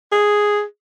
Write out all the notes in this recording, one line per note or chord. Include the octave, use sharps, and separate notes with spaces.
G#4